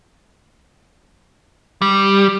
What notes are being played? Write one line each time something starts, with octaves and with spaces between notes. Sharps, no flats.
G3